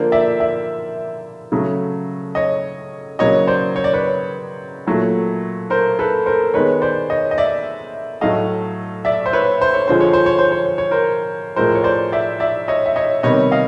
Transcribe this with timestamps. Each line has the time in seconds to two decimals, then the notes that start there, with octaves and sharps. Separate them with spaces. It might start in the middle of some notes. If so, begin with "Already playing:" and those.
Already playing: D3 F3 A#3 C5 D5
0.12 D5 E5
0.40 D5 E5
1.52 C#3 F#3 A3
2.35 C#5 D#5
3.19 C#3 F#3 A#3 C#5 D#5
3.47 C5 D5
3.76 C#5
3.84 D5
3.93 B4 C#5
4.87 A#2 F#3 A3
5.70 A#4 C5
5.99 A4 B4
6.26 A#4 C5
6.54 D#3 G#3 B3 B4 C#5
6.82 C5 D5
7.10 C#5 D#5
7.31 D#5
7.38 D5 E5
8.21 A2 F#3 A3 D#5 F5
9.05 D5 E5
9.26 C5
9.33 B4 C#5
9.61 C5
9.74 C#5
9.88 D3 F3 G#3 C5
10.01 C#5
10.13 C5
10.26 C#5
10.39 C5
10.52 C#5
10.66 C5
10.78 C#5
10.91 A#4 C5
11.56 A2 F3 G#3 A#4 C5
11.75 C#5
11.84 C5 D5
12.12 D5 E5
12.40 D5 E5
12.68 C#5 D#5
12.86 E5
12.96 C#5 D#5
13.23 C3 D#3 G3 B3 C#5 D#5
13.52 D#5 F5